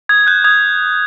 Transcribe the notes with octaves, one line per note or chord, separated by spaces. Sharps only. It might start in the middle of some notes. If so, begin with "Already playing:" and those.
D#6 G#6
F#6 G6
D#6 G#6